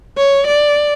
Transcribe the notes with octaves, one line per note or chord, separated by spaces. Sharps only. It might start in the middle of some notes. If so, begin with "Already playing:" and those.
C#5
D5